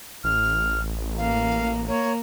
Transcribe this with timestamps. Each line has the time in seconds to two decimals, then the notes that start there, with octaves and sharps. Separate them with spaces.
0.24 A1 F6
1.18 A#3 F5
1.88 A#3 C#5